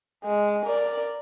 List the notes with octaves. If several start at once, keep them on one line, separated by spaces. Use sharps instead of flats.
G#3
A#4 D5